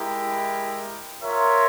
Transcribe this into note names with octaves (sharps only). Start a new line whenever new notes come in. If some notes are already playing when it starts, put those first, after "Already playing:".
Already playing: G#3 E4 G4 A#4
F4 A#4 C#5 E5